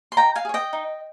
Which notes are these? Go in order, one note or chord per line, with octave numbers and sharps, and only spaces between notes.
C6
D#4 G5 A#5
F5 G#5
G#4 C#5
D#5 G5
D#4